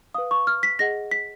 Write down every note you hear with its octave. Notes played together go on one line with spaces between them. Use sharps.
B4 F5 D#6
C#6
F6
B6
G#4 D#5 F#5 A#6
B6